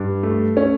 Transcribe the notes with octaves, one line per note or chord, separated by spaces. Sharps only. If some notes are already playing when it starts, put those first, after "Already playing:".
Already playing: G2
A3
C#4